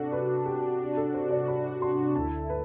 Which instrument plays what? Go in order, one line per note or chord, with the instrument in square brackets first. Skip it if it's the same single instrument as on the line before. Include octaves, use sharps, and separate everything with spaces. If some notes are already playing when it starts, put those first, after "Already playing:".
Already playing: [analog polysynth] C3 D4 F#4 [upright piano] A4
[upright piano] B4
G4
A4
C5
D5
B5
C6
[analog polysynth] D2 D3 A3 E4 [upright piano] A5
[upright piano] B4